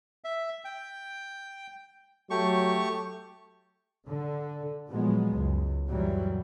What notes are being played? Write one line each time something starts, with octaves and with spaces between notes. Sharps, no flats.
E5
G5
F#3 A3 G4 C#6
D3
A#2 F3 F#3 G#3 B3
C#2 F#2
F#2 A#2 E3 F#3 G3